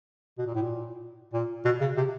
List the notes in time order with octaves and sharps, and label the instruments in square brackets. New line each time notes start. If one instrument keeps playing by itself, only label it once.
[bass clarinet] B2
A#2
A2
A#2
A#2
B2
C#3
C3